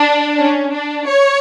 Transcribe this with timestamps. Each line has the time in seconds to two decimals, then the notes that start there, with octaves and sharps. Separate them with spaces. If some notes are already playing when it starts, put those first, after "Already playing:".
Already playing: D4
0.38 C#4
0.73 D4
1.07 C#5